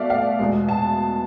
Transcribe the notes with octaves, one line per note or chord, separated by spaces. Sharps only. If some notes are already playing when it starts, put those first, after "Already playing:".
Already playing: B2 A3 D5 E5 F5
F5
E2 B2 G#3
A5